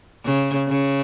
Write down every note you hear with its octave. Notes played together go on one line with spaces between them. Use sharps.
C#3
C#3